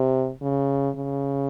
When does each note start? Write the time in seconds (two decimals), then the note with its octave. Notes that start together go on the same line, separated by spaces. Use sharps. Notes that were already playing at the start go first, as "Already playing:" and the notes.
Already playing: C3
0.42 C#3
0.96 C#3